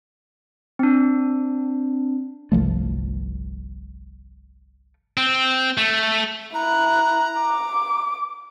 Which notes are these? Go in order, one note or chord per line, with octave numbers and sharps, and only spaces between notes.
C4 D4
G1 C2 F3 A3
C4
A3
E4 A#5 F#6
D6